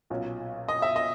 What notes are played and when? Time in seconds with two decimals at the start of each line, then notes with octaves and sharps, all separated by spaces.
0.10 B1 A#2 F#3 C#4
0.68 D#5
0.82 E5
0.96 D#5